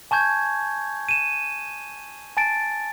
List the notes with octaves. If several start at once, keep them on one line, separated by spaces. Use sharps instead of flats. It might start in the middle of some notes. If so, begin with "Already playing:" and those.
G#5 A5 C#6 G6 G#6
D#7 E7
G#5 A5 A6 D7